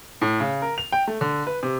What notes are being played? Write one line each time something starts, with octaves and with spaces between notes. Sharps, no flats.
A2
C#3
A#4
F7
G5
A3
D3
B4
C3